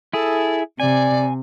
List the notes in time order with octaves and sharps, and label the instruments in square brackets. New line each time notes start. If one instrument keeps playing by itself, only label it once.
[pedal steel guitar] E4 G#4 [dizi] A4
[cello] C3 [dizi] D5 [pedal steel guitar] G#5